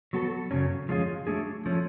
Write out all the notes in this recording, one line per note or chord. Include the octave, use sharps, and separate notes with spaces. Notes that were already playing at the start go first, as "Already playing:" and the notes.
F#3 B3 F#4 A4
F#2 C#3 F#3 C#4
F3 G#3 C#4 F4 G#4
F#3 A3 D4 G#4
F3 A3 C#4